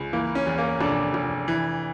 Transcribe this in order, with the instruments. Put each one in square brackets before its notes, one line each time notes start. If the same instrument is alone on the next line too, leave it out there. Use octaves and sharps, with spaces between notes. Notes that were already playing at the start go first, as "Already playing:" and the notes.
Already playing: [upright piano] C#2
E3 A#3
C#4
E2
A#3
F1 D4
F1
E3